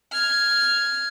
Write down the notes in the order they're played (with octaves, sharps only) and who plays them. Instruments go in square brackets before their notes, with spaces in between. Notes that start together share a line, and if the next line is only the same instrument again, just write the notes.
[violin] F6 G#6